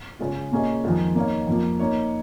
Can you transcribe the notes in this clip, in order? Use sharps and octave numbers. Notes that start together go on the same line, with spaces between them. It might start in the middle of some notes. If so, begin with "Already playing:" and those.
C#3 G#3 F4
A#2 A#3 C#4 G#4 D#5
F2 D#3 G#3 F4
A#3 D#4 C#5 F5
F2 F3 A#3
A#3 D#4 C#5